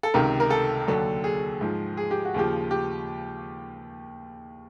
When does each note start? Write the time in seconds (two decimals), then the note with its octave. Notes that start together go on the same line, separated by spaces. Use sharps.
0.03 A4
0.14 C#2 C3 D#3 A#4
0.40 A#4
0.50 A4
0.88 D#2 D3 F#3
1.24 G#4
1.61 G#2 F3
1.97 G#4
2.11 G4
2.25 F#4
2.34 D#2 C#3 F3 G4
2.71 G4